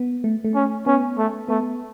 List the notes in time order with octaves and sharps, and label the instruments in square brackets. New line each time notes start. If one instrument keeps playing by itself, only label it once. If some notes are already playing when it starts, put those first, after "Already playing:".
Already playing: [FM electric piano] B3
A3
A3
[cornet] C#4
[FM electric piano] B3 [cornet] C#4
[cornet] A3
[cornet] A3 [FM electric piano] B3